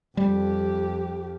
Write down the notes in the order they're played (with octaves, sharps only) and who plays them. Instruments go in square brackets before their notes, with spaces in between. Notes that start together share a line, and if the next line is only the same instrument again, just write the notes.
[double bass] F2 [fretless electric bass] G3 [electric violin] G4